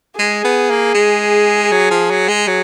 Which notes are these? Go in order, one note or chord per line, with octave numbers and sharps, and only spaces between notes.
G#3 G#4
B3
A#3
G#3
F#3
F3
F#3
G#3
F#3